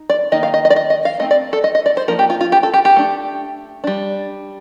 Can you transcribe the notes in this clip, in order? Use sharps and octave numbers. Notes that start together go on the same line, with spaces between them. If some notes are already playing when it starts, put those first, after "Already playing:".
Already playing: D#4
D5
D#3 A#3 D#4 D#5
F5
D#5
D#5
D5
D#5
D#5
F5
A3 C4 D#4 D#5
D5
A4
D#5
D#5
D5
C5
F3 A#3 D#4 A#4
G4
F4
F4
G4
A4
G4
G4
A3 D4
G3 D4